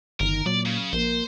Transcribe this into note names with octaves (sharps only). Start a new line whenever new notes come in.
G1 D#3 A#4
A#2 F#3 D5
C#3
A#1 A#3 C5